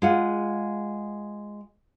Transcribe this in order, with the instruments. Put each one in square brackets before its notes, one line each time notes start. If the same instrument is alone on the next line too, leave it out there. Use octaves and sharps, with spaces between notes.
[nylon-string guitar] G#3 F4 F#5